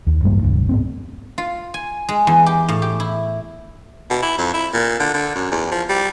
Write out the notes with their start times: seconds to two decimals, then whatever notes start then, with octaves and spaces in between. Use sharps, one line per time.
0.07 D#2
0.23 A1 G2 G3 A#3
0.42 E1 C#2 G2
0.69 G#2 B3 C4
1.38 F4
1.74 G#5
2.09 G#3
2.27 E2
2.46 G4
2.68 A2
2.82 G4
3.00 E4
4.11 B2
4.23 E4
4.38 F2
4.54 E4
4.73 A#2
5.00 D3
5.14 D3
5.35 F#2
5.51 E2
5.72 F3
5.89 G3